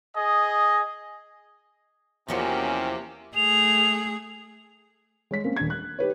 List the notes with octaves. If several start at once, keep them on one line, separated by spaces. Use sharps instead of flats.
G#4 D#5
E2 C3 F3 A#3 C#4 F#4 G4
A3 G#4 F7
G#3 C#5 B6
A#3 C4 C#4
D#1 D4 G#6
F#6
D#4 G4 B4 C#5